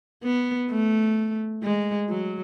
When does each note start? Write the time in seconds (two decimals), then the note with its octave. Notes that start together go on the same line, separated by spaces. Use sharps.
0.23 B3
0.70 A3
1.63 G#3
2.09 F#3